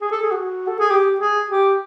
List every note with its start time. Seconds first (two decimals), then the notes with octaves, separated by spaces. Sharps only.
0.02 G#4
0.11 A4
0.22 G#4
0.32 F#4
0.68 A4
0.79 G#4
0.91 G4
1.20 G#4
1.50 G4